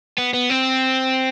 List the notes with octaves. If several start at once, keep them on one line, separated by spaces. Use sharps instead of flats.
B3
B3
C4